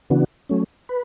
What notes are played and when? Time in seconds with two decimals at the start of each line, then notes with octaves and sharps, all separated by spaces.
0.10 C#3 E3 B3 D4 F#4
0.49 F#3 A3 C#4
0.89 B4